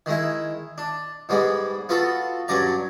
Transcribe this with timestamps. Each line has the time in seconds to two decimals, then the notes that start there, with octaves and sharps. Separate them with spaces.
0.06 D#3 G#3 E4
0.78 D4
1.29 G#2 G3 G#3 B3
1.89 B3 F4 F#4 A4
2.48 G2 F#3 C#4 D5 A#5